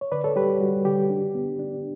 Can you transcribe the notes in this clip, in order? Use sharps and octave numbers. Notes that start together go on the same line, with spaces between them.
C#5
D3 B4 D5
A4 C#5
G3 G4 B4
G4
G3 F#4
D3 G4
D4
B3
D4